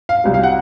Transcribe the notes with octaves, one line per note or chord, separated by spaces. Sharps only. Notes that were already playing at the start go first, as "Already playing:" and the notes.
F5
C2 C3 F#3
F5
F#5